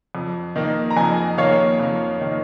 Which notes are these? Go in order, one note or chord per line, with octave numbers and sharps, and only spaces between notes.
F2
D#3 A#3
A#5
F2 D#5 G#5
D#3 A#3 C#5 F5
F2
D#3 A#3